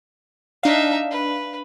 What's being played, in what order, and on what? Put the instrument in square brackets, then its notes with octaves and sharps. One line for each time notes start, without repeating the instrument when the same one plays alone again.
[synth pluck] D4 F5 [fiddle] D#4 E5
[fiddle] B4